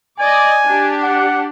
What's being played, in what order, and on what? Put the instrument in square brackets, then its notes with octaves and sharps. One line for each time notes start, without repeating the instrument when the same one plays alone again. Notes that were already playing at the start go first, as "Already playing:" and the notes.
[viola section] D5 D#5 [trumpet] G#5
[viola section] D4 G4
[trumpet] F#5